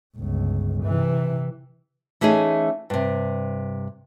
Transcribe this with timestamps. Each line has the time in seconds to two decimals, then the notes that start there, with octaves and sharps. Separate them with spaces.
0.16 G1 C#2
0.84 C3 E3
2.21 E3 A3 C#4 D#4 G#4
2.90 G2 C3